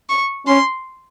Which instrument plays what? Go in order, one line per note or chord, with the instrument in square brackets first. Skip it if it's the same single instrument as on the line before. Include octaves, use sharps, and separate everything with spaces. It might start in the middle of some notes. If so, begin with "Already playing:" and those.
[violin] C#6
[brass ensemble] C#4 [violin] C6